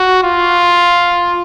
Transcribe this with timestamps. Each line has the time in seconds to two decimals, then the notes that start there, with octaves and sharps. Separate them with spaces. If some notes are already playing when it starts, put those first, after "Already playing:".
Already playing: F#4
0.23 F4